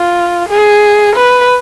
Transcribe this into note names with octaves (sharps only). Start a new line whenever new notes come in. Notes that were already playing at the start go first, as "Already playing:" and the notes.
Already playing: F4
G#4
B4